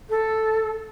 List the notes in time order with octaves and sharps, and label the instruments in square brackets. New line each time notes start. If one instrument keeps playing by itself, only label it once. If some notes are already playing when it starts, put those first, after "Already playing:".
[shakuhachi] A4